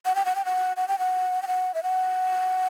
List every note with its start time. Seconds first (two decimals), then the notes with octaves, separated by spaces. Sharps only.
0.05 F#5
0.15 G5
0.25 F#5
0.35 G5
0.45 F#5
0.77 F#5
0.88 G5
0.99 F#5
1.42 G5
1.47 F#5
1.74 E5
1.83 F#5